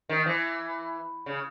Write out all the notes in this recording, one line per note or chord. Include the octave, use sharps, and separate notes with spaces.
D#3
E3
C#3